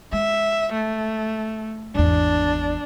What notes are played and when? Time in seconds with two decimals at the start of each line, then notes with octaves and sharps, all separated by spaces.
0.13 G#3 E5
0.73 A3
1.95 G#1 E2 D4